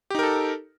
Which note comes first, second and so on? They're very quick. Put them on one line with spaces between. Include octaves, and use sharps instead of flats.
G4 D#4 A#4 A4